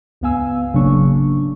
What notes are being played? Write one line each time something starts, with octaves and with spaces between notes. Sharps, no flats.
C#2 G2 B3 F5 G#5 E6
G#1 C#3 F#3 A#3 D4 C#6